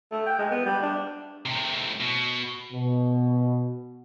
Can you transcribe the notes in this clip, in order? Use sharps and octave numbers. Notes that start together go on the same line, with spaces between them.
A3
G5
G#3
B3
G3
D4
A2 C3
B2
B2